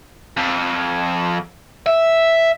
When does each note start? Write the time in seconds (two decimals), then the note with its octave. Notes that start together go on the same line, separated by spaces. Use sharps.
0.37 F2
1.86 E5